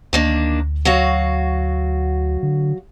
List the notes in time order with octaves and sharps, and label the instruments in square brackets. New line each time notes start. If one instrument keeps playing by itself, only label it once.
[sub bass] D2 [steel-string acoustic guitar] D#3 A#3 D4
[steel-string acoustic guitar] F#3 F#4 F5
[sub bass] D3